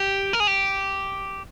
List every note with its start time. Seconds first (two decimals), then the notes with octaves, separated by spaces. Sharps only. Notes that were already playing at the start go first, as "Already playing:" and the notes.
Already playing: G4
0.33 A#4
0.40 G#4
0.47 G4